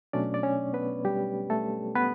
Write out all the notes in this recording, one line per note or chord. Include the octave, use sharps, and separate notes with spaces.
B2 F#3 A3 C#4 D4 D5
D5
C#4 C#5
B3 B4
G3 G4
A3 A4
B3 B4